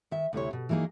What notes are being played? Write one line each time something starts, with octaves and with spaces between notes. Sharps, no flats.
D#3 E5
D2 C3 E4 C#5
B2
E3 F#3 A#3 D#4 G#4